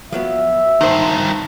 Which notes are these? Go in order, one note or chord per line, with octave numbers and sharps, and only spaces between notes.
F3 F#3 B3 E5
G2 D#3 D#4 C5